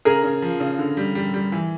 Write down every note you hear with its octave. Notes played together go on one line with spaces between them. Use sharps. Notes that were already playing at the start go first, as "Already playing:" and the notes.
C#3 G#4 A#4
C#3
F3
C#3
D3
G3
G3
G3
E3